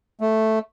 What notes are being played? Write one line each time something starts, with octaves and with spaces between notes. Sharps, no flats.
A3